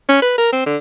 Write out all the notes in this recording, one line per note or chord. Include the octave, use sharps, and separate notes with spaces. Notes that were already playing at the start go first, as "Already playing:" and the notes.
C#4
B4
A#4
C4
D3